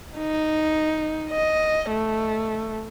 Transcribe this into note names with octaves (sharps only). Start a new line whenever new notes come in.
D#4
D#5
A3